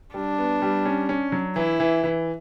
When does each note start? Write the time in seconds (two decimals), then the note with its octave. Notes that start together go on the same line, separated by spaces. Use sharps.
0.14 G3 D4
0.38 B3
0.62 G3
0.85 C#4
1.09 C#4
1.32 F#3
1.56 E3 E4
1.80 E3
2.04 E3